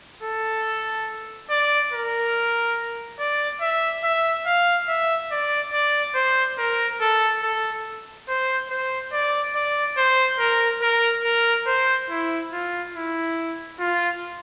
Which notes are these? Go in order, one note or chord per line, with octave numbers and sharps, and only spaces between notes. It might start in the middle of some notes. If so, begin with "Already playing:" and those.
A4
D5
A#4
D5
E5
E5
F5
E5
D5
D5
C5
A#4
A4
A4
C5
C5
D5
D5
C5
A#4
A#4
A#4
C5
E4
F4
E4
F4